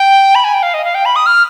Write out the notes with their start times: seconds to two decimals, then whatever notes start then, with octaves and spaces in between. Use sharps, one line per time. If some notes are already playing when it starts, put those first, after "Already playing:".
Already playing: G5
0.35 B5
0.44 G#5
0.54 G5
0.63 F5
0.74 D#5
0.85 F5
0.95 G5
1.05 B5
1.16 D#6
1.26 F6